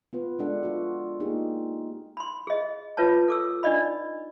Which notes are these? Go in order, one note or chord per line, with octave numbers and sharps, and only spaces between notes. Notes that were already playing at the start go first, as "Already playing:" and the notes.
B3 F4 B4
G#3 B3 D4 A4 F#5
F4 F#4
A#3 D#4 F4 G4 G#4
B5 C6
G#4 D#5
F4 B4 C#5 A5
A4 D6 E6
D4 D#4 D5 D#5 B5